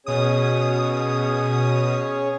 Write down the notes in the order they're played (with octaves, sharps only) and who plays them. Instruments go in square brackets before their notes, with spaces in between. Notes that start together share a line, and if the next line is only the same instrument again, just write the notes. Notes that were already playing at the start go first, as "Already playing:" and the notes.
[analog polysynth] B2 D#6 [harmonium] C#4 G#4 C#5